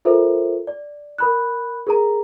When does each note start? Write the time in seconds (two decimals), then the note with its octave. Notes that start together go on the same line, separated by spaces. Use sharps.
0.05 F4 A4 A#4 C5 E5
0.67 D5
1.18 A#4 B5 F#6
1.87 G#4 A#4 A#5